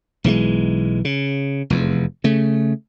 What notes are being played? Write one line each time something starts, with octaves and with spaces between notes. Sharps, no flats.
B1 E3 F3 G#3
C#3
F1 E2
C#3 A3